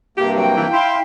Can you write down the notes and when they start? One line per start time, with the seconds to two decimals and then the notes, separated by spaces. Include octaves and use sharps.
0.18 G2 C3 A#3 G4
0.37 F#3 G5
0.57 E3
0.73 E4 F5 C6